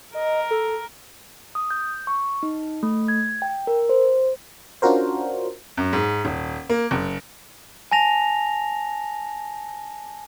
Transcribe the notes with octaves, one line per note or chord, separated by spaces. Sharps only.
A#4 D#5
A4
D#6
G6
C#6
D#4
A3
G#6
G5
A#4
C5
C#4 D4 F4 F#4 A#4 C5
F#2
G#2
D#1
A#3
F#1
G#5 A5 A#6 F7